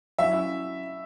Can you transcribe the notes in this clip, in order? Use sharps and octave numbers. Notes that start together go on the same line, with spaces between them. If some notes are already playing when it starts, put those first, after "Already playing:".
F#3 C#4 E4 E5